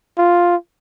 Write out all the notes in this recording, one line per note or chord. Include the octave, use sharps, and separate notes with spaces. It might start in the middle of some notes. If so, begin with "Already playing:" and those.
F4